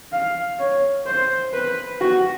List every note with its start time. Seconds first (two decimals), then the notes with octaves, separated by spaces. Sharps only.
0.12 F5
0.59 C#5
1.07 C5
1.53 B4
2.01 F#4